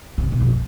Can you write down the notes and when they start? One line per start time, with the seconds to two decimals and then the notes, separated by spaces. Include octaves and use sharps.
0.18 C3
0.32 B2
0.40 F2